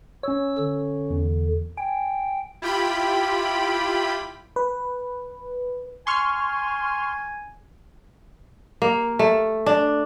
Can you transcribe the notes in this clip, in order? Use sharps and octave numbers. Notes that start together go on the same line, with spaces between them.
C#4 C#5 E6
D3
E2
G5 G#5
E4 F4 G4 G5 B5
B4
G#5 C6 C#6 F6
A#3
A3
D4